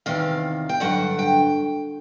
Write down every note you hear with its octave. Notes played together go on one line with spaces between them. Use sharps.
E2 C3 D#3 F5
G5
G2 D3 F#3 F#5
G5